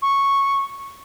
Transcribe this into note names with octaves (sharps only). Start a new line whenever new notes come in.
C#6